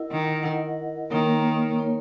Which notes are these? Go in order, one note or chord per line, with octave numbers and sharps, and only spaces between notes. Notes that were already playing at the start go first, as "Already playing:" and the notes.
Already playing: E4 A#4 D#5 F#5
D#3
E4 A#4 D#5 F#5
D#3 A#3 D#4 A#4 C#5
A#3 D#4 A#4 C#5